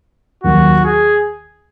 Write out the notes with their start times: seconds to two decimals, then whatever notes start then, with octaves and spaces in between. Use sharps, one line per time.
0.44 D#2 D#3 F#3 F#4
0.84 G#4